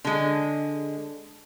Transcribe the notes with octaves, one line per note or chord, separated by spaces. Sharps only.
D3 G#3